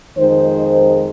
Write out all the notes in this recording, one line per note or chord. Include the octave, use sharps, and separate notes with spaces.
F2 D#3 G#3 C5